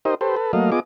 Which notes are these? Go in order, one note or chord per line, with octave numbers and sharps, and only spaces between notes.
D#4 G4 A#4 C5 D#5
G4 A4 B4 C5
A4 B4
F#3 A3 A#3 D#5 F5
B3 F4 G#4 D#5 D6